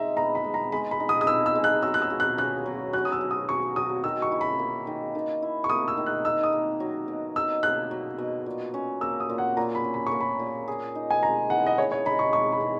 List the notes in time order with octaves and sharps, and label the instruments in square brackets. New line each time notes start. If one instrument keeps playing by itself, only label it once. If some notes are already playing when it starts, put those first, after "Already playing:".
Already playing: [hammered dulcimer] G#3 D#4 [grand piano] E5
[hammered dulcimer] B3 [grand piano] A#5
[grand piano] B5
[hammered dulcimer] G#3
[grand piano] A#5
[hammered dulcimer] G#3 [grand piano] B5
[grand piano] B5
[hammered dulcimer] D#4
[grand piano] D#6
D#6
[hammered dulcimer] B3 [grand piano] E6
[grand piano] E6
[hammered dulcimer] G#3
[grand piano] F#6
[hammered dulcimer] F#3 [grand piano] E6
[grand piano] F#6
E6
[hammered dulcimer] F#4
[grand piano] F#6
[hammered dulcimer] C#4 [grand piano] F#6
[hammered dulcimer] F#3
[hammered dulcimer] F#3 [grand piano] F#6
[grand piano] D#6
E6
[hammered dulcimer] F#4
[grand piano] D#6
[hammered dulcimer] C#4 [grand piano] C#6
[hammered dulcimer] F#3 [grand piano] D#6
[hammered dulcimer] D#3 [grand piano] E6
[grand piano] C#6
[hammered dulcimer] E4
[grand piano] B5
[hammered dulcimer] A#3
D#3
D#3
E4
[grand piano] C#6
[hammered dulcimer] A#3 [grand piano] D#6
[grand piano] E6
[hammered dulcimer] D#3
[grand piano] F#6
[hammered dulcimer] D#4 [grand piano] E6
[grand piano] D#6
[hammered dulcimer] A#3
F#3
B2
[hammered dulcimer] D#4 [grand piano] E6
[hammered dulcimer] A#3 [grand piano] F#6
[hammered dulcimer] F#3
B2
A#2
C#4
[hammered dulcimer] A#3 [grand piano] E6
[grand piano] D#6
[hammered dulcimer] A#2
[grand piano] F#5
[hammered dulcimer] A#2 [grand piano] A#5
[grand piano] B5
[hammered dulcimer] C#4
[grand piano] B5
C#6
[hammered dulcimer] A#3
[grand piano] B5
[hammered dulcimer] A#2
G#4
D#4
[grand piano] G#5
[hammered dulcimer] G#3 [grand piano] A#5
[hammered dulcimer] E3 [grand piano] F#5
[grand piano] D#5
[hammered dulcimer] G#4 [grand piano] C#5
[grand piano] C#5
[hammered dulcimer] D#4 [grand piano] B5
[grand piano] C#6
[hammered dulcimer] G#3 [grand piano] C#6
[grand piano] B5
[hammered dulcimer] E3